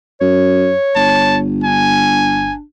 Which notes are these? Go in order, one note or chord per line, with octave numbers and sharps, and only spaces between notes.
F#2 C#5
G1 A5
D4 G#5